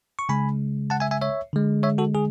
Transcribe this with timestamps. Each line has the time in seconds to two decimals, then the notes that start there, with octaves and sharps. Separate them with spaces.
0.19 C#6
0.29 C#3 G#3 G#5 B5
0.90 F#5 A5
1.00 E5 G#5
1.11 E5 G#5
1.21 C#5 E5
1.53 D3 G#3
1.83 C#5 E5
1.98 F#4 A4
2.15 G#4